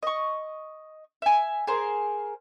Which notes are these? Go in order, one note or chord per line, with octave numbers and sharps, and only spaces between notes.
D#5 C#6
E5 G#5
G#4 A#4 C5